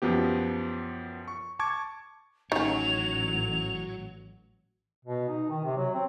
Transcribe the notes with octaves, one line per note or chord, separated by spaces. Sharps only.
F#2 F3 B3 G4
C#6
A5 C#6 D6 G#6
A1 D#3 F#3 C#4 C#5 F7
B2
D#4
D#3
C3
F#3
C4